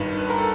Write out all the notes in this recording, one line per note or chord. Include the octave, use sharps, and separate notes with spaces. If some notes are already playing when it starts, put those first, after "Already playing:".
Already playing: G#1 G2 D#3 B4
B4
A#4
A4